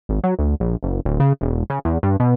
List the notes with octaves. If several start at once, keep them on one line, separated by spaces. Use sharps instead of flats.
G#1
F#3
D2
A#1
F#1
D1
C#3
E1
C#3
E2
G2
B2